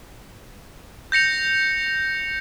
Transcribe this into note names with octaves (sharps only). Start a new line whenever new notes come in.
G6 A#6 C#7 F7